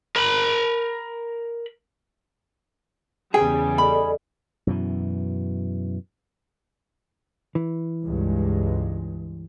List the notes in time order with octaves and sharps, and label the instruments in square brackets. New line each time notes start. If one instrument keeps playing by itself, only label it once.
[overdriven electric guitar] A#4 B5
[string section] E2 C#3 G3 [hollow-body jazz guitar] G#4 [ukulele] G5
[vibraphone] A4 D5 D#5 [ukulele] B5
[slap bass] F#2 B2 E3
[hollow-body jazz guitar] E3
[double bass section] C#2 G2 G#3